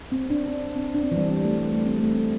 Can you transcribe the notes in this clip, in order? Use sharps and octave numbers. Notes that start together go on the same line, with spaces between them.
C4
D4
C4
C4
D4
C4
E3
G3
C4
A3
G3
A3
C4
A3
C4